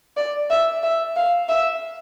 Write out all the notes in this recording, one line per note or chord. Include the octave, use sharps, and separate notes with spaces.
D5
E5
E5
F5
E5